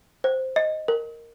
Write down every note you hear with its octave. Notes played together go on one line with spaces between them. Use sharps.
C5
D#5
A#4